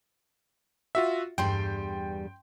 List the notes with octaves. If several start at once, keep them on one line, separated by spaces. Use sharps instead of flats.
F4 F#4 E5
E2 G2 G3 G5 C6